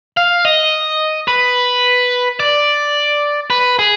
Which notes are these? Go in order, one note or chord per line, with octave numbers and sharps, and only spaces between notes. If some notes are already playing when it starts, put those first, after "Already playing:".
F5
D#5
B4
D5
B4
G#4